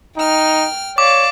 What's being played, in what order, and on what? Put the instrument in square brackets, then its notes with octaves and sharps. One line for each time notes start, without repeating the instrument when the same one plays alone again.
[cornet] D#4 [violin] G5 F6
[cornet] C#5 [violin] D5 F5 [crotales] D6